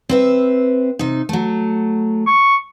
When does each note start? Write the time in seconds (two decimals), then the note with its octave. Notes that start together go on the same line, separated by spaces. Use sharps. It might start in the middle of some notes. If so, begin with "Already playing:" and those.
0.09 C4 B4 E5
0.99 C3 D#4
1.29 F#3 A3
2.27 C#6